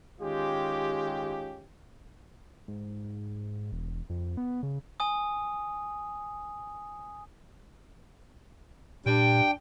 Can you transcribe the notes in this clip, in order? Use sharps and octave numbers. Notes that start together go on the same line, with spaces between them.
D#3 G#3 C#4 F4 G4
G#2
E1
F2
B3
C#3
G#5 D#6
G2 A#2 G3 D4 G5